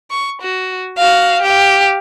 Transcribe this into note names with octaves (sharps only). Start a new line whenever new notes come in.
C#6
F#4
F#4 F5
G4 F5